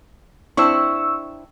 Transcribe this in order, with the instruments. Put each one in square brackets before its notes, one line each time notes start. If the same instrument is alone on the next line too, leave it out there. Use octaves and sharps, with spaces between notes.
[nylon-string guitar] C4 D4 E4 [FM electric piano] C#6 E6